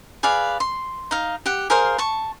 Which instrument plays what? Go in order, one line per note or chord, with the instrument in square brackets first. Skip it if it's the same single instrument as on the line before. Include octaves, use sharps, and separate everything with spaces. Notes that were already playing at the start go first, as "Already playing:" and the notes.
[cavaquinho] G#4 B4 D5 F5
C6
D#4 F5
G4 F#5
G#4 A#4 C5 F5
A5 C#6